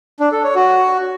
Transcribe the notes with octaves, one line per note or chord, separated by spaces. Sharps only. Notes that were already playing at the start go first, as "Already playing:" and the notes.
D4
A4
C#5
F#4